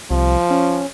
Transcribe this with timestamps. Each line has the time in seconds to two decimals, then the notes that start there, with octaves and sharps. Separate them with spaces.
0.10 C2 F3
0.50 C#4